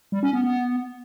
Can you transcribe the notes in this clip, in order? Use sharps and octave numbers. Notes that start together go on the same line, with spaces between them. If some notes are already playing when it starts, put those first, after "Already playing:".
G3
C#4
B3
B3